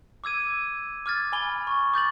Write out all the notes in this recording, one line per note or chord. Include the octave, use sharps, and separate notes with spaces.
D6 E6 G#6 D#7
D6 F6 G#6 A6
G#5 B5 G7
C#6
D6 G6 A6 F#7